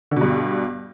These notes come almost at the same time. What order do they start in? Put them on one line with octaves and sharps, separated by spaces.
D3 B2 G2